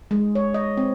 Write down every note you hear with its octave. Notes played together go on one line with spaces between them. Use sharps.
G#3
C#5
D#5
C4